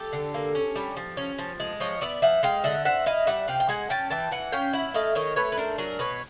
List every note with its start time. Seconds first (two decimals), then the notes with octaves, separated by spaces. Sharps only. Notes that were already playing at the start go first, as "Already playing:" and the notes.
Already playing: G4 A4
0.13 D3
0.34 A#3
0.55 C#4
0.75 G3
0.97 F3
1.17 C#4
1.38 F3
1.60 G#3
1.80 F3 C#5 D#5
2.01 B3 D5 E5
2.22 F3 E5 F#5
2.43 G#3 F5 G5
2.64 D3 E5 F#5
2.85 C4 E5 F#5
3.06 E4 D#5 F5
3.27 G3 E5 F#5
3.48 C3 F5 G5
3.60 G5
3.68 G#3 F#5 G#5
3.90 C#4 G5 A5
4.10 E3 G5 A5
4.31 E3 F#5 G#5
4.52 C#4 F5 G5
4.73 E4 E5 F#5
4.94 A3 D#5 F5
5.15 D#3 C#5 D#5
5.36 A3 B4 C#5
5.52 B4
5.57 D4 A#4 C5
5.78 F#3 G#4 A#4
5.99 B2 B4 C#5